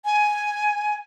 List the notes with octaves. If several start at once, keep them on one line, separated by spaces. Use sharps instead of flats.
G#5